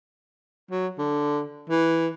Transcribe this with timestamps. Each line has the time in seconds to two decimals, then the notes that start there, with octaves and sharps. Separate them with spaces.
0.71 F#3
0.98 D3
1.69 E3